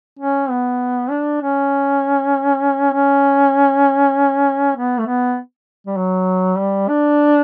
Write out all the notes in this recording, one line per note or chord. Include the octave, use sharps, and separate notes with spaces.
C#4
B3
D4
C#4
C#4
B3
A3
B3
G3
F#3
G3
D4